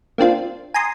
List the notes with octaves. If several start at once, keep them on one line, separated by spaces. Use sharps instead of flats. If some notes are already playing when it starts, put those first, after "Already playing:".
A#3 C4 D4 F4
G#5 A#5 C6 D#6